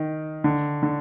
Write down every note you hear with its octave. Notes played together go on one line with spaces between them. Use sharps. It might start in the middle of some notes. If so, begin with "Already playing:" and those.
Already playing: D#3
D3
D3